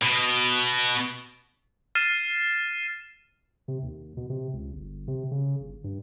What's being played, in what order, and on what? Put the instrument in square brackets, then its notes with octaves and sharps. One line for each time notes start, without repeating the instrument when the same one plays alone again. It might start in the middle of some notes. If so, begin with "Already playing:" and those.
[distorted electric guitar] B2
[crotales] F6 A6 C7 D#7 E7
[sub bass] C3
D#2
B2
C3
C#2
G1
C3
C#3
G1
G2